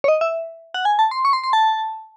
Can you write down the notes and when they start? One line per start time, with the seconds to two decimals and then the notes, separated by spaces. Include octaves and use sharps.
0.04 C#5
0.08 D#5
0.21 E5
0.74 F#5
0.85 G#5
0.99 A5
1.11 C6
1.25 C#6
1.33 C6
1.44 C6
1.53 A5